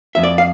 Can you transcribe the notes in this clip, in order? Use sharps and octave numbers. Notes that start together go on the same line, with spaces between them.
F2 E5
D5
F5